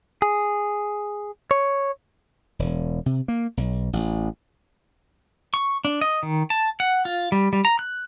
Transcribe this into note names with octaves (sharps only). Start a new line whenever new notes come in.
G#4
C#5
E1
C3
A#3
B1
A1
C#6
D4
D#5
D#3
A5
F#5
F4
G3
G3
A#5
F#6